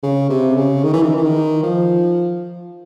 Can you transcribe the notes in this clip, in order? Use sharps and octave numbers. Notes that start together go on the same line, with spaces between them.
C#3
C3
C#3
D#3
E3
D#3
E3
D#3
F3